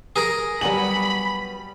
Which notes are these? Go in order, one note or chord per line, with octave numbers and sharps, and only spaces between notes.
G#4 A#4
F#3 G3 B3 G#5 B5 F#7